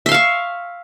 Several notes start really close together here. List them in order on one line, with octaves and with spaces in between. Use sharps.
E5 C6 F5 C#6